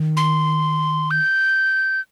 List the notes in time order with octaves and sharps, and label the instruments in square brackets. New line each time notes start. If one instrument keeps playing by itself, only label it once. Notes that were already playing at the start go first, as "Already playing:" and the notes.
Already playing: [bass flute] D#3
[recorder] C6
G6